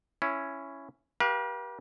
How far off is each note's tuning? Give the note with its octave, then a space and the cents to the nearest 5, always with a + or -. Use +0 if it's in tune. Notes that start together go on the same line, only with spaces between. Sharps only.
C#4 +0 E4 +15
G4 -15 B4 -45 F5 +0